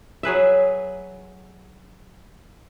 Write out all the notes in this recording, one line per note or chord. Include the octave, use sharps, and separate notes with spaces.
F#3 G#4 B4 E5